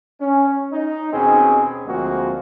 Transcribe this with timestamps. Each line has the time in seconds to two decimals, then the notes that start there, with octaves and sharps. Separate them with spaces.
0.20 C#4
0.72 D#4
1.13 D#2 B2 C4 C#4 G#4
1.86 D2 F3 G#3 A#3 C4 F#4